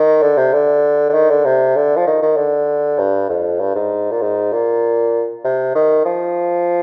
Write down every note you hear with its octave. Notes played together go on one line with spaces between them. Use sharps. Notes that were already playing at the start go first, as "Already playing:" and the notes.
Already playing: D#3
D3
C3
D3
D3
D#3
D3
C3
D3
F3
D#3
D#3
D3
G2
F2
G2
G#2
A#2
G#2
A#2
C3
D#3
F3